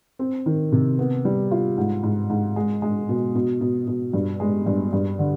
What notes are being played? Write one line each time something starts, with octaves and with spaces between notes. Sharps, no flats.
C4
D#3
C3
B3
G3
F4
G#2
G#2
G#2
G#3
G#3
B2
B2
B2
B2
G2
G#3
G2
G2
D3